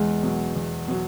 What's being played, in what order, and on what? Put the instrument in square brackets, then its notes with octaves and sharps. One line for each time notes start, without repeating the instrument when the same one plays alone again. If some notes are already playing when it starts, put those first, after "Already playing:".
Already playing: [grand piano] E2 [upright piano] G#3
[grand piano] B2 F#3
E2
B2 F#3